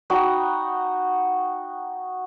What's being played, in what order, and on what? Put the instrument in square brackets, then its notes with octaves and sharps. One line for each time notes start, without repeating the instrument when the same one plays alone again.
[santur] D#4 F#4 G5 B5